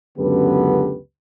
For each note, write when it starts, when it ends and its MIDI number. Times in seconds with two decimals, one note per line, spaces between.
0.18 0.97 37
0.18 0.97 42
0.18 0.97 50
0.18 0.97 59
0.18 0.97 67
0.18 0.97 71